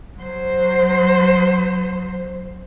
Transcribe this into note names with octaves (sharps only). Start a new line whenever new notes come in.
F#3 C5